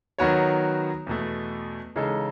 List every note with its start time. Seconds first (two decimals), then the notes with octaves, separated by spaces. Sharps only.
0.18 D#3 F#3 B3 F#4 C#5
1.07 E2 B2 A3
1.96 C#3 E3 G#3 D#4 A4